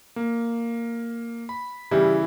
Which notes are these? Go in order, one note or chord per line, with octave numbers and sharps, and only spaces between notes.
A#3
B5
C#3 E3 G3 E4